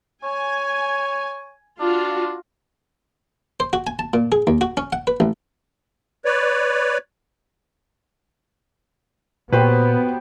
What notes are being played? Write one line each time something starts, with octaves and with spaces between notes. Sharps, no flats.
C#5 G#5
D4 F4 F#4
C5
F#4
G#5
A5
A#2
G#4
D#2
F#4
C#4
F#5
B4
A1
B4 C#5 D5
A#2 F#3 B3 G4 B4 C5